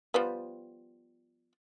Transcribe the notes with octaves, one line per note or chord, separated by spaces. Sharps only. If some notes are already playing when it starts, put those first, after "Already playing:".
F3 G3 B3